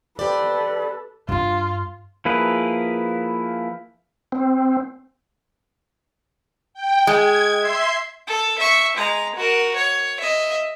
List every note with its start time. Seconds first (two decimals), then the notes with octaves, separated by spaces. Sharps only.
0.19 G4 A4 B4 C5 D5
1.29 G2 D4 F4
2.25 F3 A#3 E4 G#4 B4
4.32 C4
6.74 G5
7.07 G#3 G#6
7.58 E5 C6 C7
8.27 A4
8.59 E5 C#6
8.97 G#3 A#5
9.36 F#4 A#4
9.76 C#5
10.20 D#5 E5